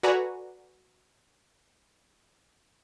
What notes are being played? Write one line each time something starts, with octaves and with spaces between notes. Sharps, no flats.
F#4 A4 B4 D5 G#5 A#5